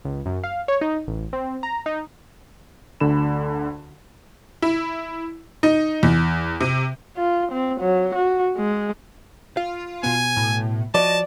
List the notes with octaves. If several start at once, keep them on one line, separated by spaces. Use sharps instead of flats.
C#2
F#2
F5
C#5
D#4
A1
C4
A#5
D#4
D2 D3 B5 E7
E4
D#4
E2
C3
F4
C4
F#3
F#4
G#3
F4 F5
B2 B3 G#5
A2
F3 F#4 D5 D#5 A5